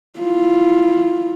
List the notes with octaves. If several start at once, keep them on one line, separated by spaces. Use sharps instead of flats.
E4 F4